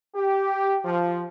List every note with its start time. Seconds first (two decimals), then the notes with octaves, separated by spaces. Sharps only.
0.15 G4
0.85 F3